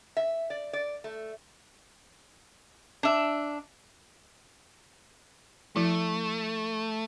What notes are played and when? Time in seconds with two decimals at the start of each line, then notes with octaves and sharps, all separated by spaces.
0.17 E5
0.50 D5
0.73 D5
1.04 A3
3.03 D4 E5
5.76 F3 A3 E4